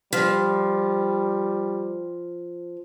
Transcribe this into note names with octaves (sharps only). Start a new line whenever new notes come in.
F3 G3